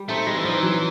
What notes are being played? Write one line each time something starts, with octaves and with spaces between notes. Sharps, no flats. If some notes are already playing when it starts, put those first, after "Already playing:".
Already playing: G3
A3 C4 D#4
G3 G#3
E3
F3 C4 D#4
E3
F#3